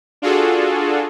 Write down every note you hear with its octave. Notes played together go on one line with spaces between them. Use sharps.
D4 F4 F#4 G#4 A4